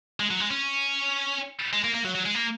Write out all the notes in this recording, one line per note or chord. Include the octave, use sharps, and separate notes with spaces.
G#3
F#3
G#3
C#4
G#3
A#3
A#3
F#3
F#3
G#3
A#3